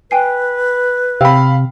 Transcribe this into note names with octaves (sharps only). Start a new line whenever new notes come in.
B4 G5 G#5 C7
C3 F5 G5 B5 E6